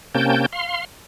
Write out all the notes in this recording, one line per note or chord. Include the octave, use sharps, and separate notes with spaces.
C3 A#3 C#4 G5 A5 G6
F5 C6